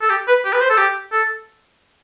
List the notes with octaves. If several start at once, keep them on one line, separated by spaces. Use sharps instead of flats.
A4
G4
B4
G4
B4
C5
A4
G4
A4